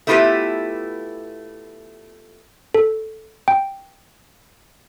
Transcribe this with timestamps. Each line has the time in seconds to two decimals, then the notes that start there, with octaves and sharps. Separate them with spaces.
0.07 A3 B3 E4 F4 G4 B4
2.74 A4
3.48 G5